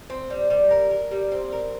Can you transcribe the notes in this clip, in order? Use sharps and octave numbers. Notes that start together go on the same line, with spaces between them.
C4
G3
G3
A#4
A#4
G3
C4
A#4